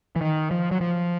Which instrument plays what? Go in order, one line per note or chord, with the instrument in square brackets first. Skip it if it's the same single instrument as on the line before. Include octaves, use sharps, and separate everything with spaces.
[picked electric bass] E3
D#3
F3
F#3
F3